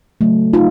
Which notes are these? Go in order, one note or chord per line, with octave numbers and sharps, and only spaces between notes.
C#3 F#3 A3
D#4 F4